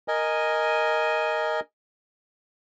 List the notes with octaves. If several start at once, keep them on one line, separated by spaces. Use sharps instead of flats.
A#4 D#5 G#5